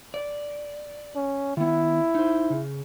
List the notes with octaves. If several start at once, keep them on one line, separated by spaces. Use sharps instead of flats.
D5
C#4
D#3 B3 E4
D#4 C5
C#3